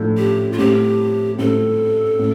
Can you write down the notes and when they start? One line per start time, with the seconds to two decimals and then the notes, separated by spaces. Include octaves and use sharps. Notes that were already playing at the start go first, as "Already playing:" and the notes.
Already playing: A2 F3 D4 A4
0.17 G4
0.52 F4
0.58 A2 G3 C4 G4
1.39 A2 G3 C4 A4
2.19 A2